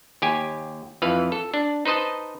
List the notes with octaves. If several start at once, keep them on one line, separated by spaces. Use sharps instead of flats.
D#2 G4 G#5
F2 E3 B4 F5
A4
D4
D#4 B4 C5 D#5 A5